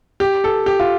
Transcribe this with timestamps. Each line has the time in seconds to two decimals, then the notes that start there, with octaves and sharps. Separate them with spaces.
0.20 G4
0.44 A4
0.66 G4
0.80 F4